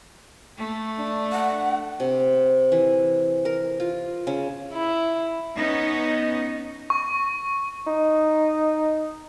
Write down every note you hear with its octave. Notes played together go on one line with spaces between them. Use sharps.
A3
D4
F#5
C3
E3
A#4
F4
C#3
E4
B3 C#4 D#4
C#6
D#4